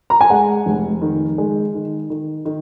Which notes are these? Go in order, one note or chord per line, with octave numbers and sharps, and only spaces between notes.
A#5
G#5
G#3 F#5
F1
D#3
G#3
D#3
D#3
D#3